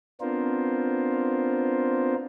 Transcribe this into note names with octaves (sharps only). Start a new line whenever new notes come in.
B3 C4 D4 F4 A#4 C5